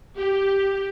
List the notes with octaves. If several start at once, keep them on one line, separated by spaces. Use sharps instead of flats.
G4